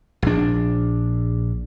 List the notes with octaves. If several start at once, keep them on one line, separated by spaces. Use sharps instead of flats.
A#1 D4